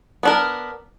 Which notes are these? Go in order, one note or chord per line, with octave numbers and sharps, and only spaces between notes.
B3 D4 A#4